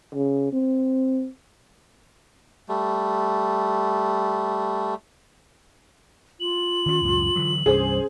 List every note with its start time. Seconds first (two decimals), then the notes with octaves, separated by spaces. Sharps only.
0.14 C#3
0.52 C4
2.69 G3 A3
6.40 F4 F#7
6.86 D#3 C#4
7.03 C#2 F#2 A2
7.36 D3 E3 F#3
7.66 C2 G2 G3 C#4 G#4 C5